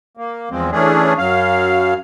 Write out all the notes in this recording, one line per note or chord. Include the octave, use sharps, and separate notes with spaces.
A#3
E2 F3 G#3 C4
E3 A3 C#4 D4 G#4
F#2 F#3 F5